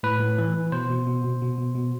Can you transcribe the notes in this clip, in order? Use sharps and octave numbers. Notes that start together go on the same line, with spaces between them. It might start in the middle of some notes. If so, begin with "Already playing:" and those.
A2 B4
A2
E3
E3
B2 C5
B2
B2
B2
B2
B2
B2